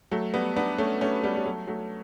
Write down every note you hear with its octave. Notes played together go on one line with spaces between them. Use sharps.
F#3 A3
G3 B3
B3 D4
A3 C#4
A3 C#4
G3 B3
G3
F#3 A3
F#3 A3